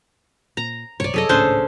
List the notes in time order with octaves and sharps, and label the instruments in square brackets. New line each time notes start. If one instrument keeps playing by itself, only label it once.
[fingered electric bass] A#2 [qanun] A#5
[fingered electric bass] B1 G2 C3 [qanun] C#5 D5
[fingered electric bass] F#2 C3 F#3 [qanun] G#4 A4 D#5
[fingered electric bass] G#1 C#2 A2 [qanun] C#4 D4 C5